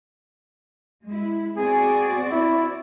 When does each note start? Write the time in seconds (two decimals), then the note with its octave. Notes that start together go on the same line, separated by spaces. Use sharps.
1.04 G#3 E4
1.57 C4 F#4 G#4 D5
2.31 E4